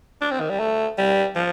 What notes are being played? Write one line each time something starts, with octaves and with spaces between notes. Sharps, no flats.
D4
C4
D#3
G3
A3
G3
F3